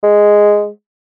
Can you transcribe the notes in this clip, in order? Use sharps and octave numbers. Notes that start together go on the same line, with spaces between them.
G#3